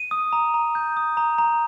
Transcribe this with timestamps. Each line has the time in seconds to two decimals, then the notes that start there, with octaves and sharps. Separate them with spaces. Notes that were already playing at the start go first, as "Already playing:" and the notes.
Already playing: D#7
0.11 D#6
0.33 A#5
0.54 A#5
0.75 G6
0.97 D#6
1.17 A#5
1.38 A#5